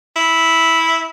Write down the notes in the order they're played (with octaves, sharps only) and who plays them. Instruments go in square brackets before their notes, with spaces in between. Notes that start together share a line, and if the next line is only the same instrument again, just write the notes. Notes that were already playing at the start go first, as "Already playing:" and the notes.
[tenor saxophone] E4